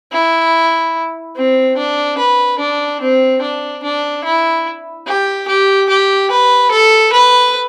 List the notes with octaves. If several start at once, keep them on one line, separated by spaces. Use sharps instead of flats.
E4
C4
D4
B4
D4
C4
D4
D4
E4
G4
G4
G4
B4
A4
B4